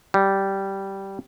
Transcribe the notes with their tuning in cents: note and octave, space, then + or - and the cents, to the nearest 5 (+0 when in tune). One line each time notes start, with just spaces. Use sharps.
G3 -10